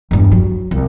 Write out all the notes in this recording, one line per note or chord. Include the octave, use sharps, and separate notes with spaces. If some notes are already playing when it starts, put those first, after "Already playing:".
E2 G2
F#3
C2